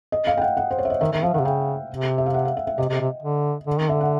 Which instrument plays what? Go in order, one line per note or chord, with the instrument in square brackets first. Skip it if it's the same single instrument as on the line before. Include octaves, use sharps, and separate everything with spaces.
[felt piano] D#5
F5
G5
F#5
F#5
C5
C#5
E5
D#5
[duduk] D#3 [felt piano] E5
[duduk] D#3 [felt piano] E5
[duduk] F3 [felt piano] F5
[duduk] D#3 [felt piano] F#5
[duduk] C3
[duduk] C#3 [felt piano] G5
[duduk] C3
[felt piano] E5
F5
F#5
F5
E5
E5
[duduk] C3 [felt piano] D#5
[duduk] C3
C3
D3
D3
D#3
[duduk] D3 [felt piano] E5
[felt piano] F#5